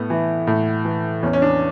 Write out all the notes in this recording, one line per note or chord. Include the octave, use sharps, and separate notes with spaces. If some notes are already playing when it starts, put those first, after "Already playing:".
Already playing: A2 B3
E3
A2
E3
E2 C#4
C#4
D4